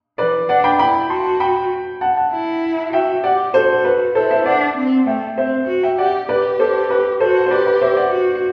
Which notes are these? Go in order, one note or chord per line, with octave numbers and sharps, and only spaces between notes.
E3 B4 D5
D4 D5 F#5
G5 B5
E4 G5 B5
F#4 A5 C6
G5 B5
F#5 A5
F#5 A5
E4
F#4 E5 G5
G4 D5 F#5
F#4 A4 C5
B4
E4 A4 C5
C5 E5
D4 D5 F#5
C4
A3 E5 G5
C4 C5 E5
F#4
E5 G5
G4 D5 F#5
G4 B4 D5
A4 C5
B4
F#4 A4 C5
C5
G4 B4 D5
B4 D5
C5 E5
D5 F#5
F#4